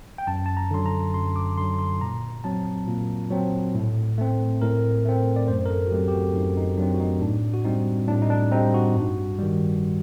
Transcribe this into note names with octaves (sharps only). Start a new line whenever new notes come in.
G5
F#2 A5
A5
A#5
D3 F#3 C6
A#5
F#2 C6
D6
D3 F#3 C6
C6
A#2 A#5
F#3 C4 A5
A#2
F#3 C4
A2
A3 C4
A2 A#4
A3 C4
D5
F#2 C5
A#4
A4
F#4
F#3 A3 C4 G4
G4
F#4
F#2 D#4
D#4
F#3 A3 C4 D4
F#4
D#4
A2 D4
F#4
G3 C4 D#4
A2 D4
D#4
D4
G3 C4 D#4
F#4
G2
D#3 G3